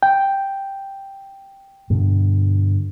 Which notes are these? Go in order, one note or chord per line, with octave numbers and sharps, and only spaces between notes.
G5
G2 B2 D3